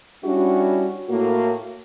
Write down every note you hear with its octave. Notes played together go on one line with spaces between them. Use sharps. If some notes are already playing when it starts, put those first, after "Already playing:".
G3 C#4 D4 E4 F#4 G4
A2 A#3 F#4